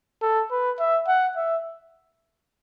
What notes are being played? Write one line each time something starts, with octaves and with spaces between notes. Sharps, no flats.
A4
B4
E5
F#5
E5